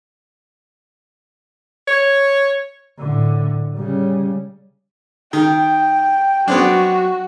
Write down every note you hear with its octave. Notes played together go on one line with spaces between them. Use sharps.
C#5
A2 D3
C#3 G3
D#3 G5
F#3 B3 C4 D4 F#4